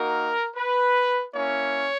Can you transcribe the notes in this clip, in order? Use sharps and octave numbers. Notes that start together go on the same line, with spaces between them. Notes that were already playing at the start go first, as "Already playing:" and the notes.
Already playing: A#3 D#4 F#4 A#4
B4
A#3 C#4 E4 C#5